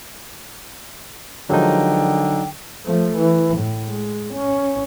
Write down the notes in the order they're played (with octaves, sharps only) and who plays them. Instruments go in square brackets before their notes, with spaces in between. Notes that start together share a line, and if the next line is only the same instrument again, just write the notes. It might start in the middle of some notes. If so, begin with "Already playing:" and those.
[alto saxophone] D3 [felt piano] F3 G#3 A#4 [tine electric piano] F#3 D#4 [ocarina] G5
[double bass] F3 A3
E3
A2
G#3
C#4